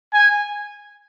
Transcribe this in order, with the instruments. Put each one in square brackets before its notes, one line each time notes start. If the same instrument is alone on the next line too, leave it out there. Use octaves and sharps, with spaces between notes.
[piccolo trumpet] G#5